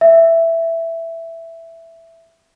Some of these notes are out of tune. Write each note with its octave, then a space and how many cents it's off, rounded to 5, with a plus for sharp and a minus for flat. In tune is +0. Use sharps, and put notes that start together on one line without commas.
E5 +5